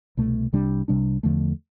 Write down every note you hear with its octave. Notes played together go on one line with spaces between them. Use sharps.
C2 B2 A3
C2 C3 G3 D4
C2 C3 G3 D4
E2 D3 F3 A3